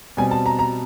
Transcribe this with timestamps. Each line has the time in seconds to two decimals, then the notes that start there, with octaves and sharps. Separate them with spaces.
0.17 B2 G3 C4 G#5
0.31 A5
0.46 A#5
0.59 A#5